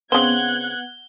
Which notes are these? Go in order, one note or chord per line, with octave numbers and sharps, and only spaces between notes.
C#3 B3 C4 F#5 F#6 G#6 G7